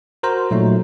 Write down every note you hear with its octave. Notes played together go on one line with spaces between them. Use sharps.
F#4 A#4 C5 A#5
A#2 F#3 A3 D#4